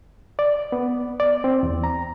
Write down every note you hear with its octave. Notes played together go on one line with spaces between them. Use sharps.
D5
B3
D5
C4
E2
A#5